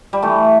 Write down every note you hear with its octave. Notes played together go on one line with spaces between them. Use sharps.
G3
E3 A3